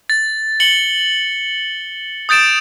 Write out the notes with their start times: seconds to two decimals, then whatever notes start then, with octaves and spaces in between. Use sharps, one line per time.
0.10 A6
0.60 C#7 F#7 G7
2.29 D#6 G6 A6 D7 E7